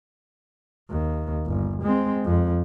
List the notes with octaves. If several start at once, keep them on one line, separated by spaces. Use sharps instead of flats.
D#2
G1
G#3 C4
F2